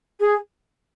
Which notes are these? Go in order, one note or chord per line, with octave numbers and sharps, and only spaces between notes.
G#4